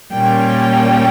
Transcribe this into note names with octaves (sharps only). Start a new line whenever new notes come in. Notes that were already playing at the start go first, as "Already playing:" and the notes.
A#2 G3 A#3 C#4 G5